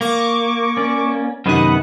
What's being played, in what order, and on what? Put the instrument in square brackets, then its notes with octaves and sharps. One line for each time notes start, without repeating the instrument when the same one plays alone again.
[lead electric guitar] A#3 [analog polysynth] C#6 D6
[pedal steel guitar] C#4 D5
[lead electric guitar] F#2 D#3 [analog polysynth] C3 F#5 [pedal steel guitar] B3 B4 D#5